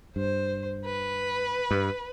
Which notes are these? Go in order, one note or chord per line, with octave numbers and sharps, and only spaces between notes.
G2 C5
B4
G2